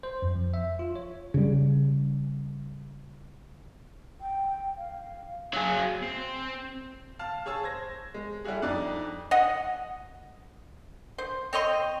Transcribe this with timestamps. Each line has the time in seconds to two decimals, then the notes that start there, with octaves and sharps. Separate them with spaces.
0.03 C5
0.22 F2
0.35 F3
0.54 E5
0.79 F4
0.96 C#5
1.34 C#3 G3
4.21 G5
4.77 F5
5.54 F#3 G#4 F5
6.02 C4
7.19 F5 A5 F6
7.46 G#4 C#5 A5 E6
7.63 C5 G#6 A#6
8.14 G#3
8.44 G3 A3 E4 F#4 G#4
8.62 F2 D4 D#4 D5 F#6
9.31 D#5 F#5
11.18 C5
11.53 C4 C#5 D#5 C6